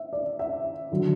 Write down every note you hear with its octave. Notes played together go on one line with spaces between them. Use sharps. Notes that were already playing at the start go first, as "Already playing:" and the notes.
Already playing: E5
D5
E5
D3 F#3